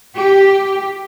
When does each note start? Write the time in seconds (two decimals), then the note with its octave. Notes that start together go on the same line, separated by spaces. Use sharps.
0.15 G4